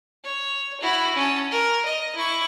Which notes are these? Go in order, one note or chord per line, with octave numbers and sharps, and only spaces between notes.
C#5
E4 F#4
C#4 A5
A#4
D#5
E4 C#6